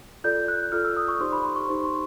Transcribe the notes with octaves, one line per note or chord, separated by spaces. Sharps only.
F4 A4 D5 G6
F#6
F4 A4 D5 F6
E6
D#6
C#6
D#4 G4 C5 C6
B5
C6
C#6
D#4 G4 C5
C6